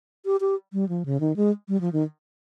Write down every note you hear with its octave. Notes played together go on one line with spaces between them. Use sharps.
G4
G4
G3
F3
C#3
D#3
G#3
G3
F3
D#3